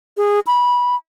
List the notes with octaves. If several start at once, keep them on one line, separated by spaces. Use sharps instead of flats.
G#4
B5